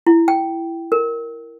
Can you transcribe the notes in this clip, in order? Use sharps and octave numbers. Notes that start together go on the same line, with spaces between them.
E4
G5
A#4